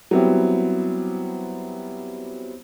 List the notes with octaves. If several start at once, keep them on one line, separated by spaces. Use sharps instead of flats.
F#3 G3 B3 C4 E4 G4